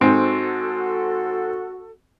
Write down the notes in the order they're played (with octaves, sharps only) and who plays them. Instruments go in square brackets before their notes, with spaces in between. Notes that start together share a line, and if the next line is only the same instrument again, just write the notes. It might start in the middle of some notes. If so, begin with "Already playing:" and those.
[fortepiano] G#2 C4 [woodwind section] F#4 A4